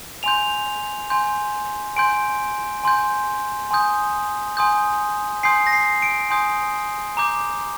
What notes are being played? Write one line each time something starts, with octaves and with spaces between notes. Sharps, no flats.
G#5 C6 G6 F7
G#5 C6 G6
G#5 C6 G6 D7
G#5 C6 G6
G#5 C6 D#6 G6
G#5 C6 D#6 G6
G#5 C6 D#6 G6 C7
A#6
C7
D7
G#5 C6 D#6 G6
A#5 D6 G6